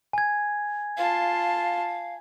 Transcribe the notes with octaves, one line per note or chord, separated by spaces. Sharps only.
G#5 G#6
F4 F5 A5